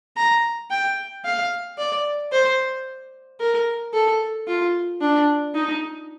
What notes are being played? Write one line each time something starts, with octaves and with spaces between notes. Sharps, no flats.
A#5
G5
F5
D5
C5
A#4
A4
F4
D4
D#4